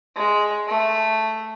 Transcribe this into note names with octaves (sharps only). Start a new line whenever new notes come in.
G#3
A3